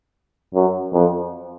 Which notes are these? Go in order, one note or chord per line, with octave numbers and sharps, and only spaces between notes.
F#2
F2